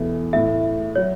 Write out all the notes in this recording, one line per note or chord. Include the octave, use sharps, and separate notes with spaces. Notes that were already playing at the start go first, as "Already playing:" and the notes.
Already playing: E2 B2 A3 E4 A4
A2 A3 E4 E5
F#3 C#5